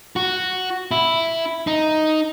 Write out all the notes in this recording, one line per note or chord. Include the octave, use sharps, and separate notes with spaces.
F#4
E4
D#4